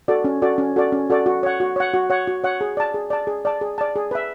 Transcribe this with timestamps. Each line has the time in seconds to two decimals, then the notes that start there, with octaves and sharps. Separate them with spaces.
0.08 F#4 A4 D5
0.24 C#4
0.42 F#4 A4 D5
0.58 C#4
0.76 F#4 A4 D5
0.92 C#4
1.10 F#4 A4 D5
1.26 F#4
1.43 C#5 F#5
1.60 F#4
1.76 C#5 F#5
1.94 F#4
2.10 C#5 F#5
2.27 F#4
2.44 C#5 F#5
2.61 G#4
2.77 D5 A5
2.94 G#4
3.10 D5 A5
3.27 G#4
3.45 D5 A5
3.61 G#4
3.78 D5 A5
3.96 G#4
4.11 B4 E5